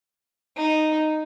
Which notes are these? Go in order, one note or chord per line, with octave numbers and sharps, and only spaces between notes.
D#4